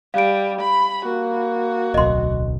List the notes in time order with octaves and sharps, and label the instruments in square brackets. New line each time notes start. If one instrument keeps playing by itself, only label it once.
[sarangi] G3 [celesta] F5 D7
[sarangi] B5
[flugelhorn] A#3 [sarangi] F#4
[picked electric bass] D1 B1 [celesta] D#5 C6